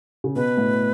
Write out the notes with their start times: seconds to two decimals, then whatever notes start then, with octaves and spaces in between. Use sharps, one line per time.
0.24 C#3
0.36 B2 B4
0.57 A2